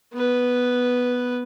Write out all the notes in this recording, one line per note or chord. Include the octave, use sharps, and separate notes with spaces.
B3 B4